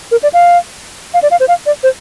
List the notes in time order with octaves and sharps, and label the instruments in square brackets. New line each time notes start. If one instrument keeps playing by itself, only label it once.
[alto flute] A#4
D5
F5
F5
D5
F5
C5
F5
D5
C5